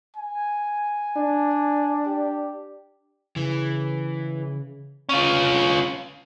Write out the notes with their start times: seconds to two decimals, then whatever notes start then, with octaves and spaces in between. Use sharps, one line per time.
0.16 G#5
1.17 D4
2.06 G4
3.36 C#3 E3
5.09 C#4 F4